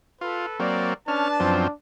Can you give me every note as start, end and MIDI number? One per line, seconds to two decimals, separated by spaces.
0.21 0.46 65
0.21 0.59 69
0.21 0.59 71
0.60 0.94 54
0.60 0.94 58
0.60 0.94 60
0.60 0.92 74
1.08 1.28 61
1.08 1.73 62
1.08 1.63 71
1.08 1.63 81
1.08 1.28 89
1.40 1.67 42
1.40 1.67 53
1.40 1.67 60